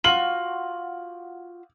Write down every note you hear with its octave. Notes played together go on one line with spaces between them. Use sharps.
F4 F#4 F#7